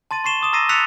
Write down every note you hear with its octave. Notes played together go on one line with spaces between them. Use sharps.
A5 C6 A6 D#7
C6 C#6 C7 E7 G7
D6 D#6 E7
A#5 E6 A6 A#6 C7 D#7
E6 F#6 A6 B6 C#7 F7